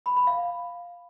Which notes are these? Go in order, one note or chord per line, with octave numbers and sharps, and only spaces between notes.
B5
B5
F5